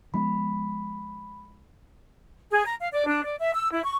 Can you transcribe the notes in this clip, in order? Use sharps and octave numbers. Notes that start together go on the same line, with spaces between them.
F3 G#3 B3 B5
G#4
A#5
F5
D5
D4
D5
E5
E6
E4
C#6